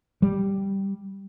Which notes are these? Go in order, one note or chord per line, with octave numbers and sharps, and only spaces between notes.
G3